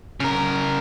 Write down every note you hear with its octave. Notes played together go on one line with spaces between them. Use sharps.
C#3 A#4